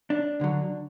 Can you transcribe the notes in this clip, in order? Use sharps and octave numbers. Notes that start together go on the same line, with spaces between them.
D4
D2 D3 F#3